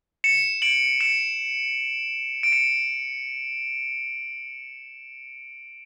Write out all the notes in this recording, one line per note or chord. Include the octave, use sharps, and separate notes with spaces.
C#7 E7
D7 F#7
C#7 E7
D7
C#7 E7